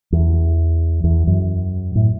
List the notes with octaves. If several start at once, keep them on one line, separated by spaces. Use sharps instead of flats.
E2
E2
F#2
A2